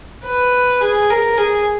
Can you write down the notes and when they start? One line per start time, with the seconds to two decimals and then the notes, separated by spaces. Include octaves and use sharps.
0.25 B4
0.81 G#4
1.10 A#4
1.38 G#4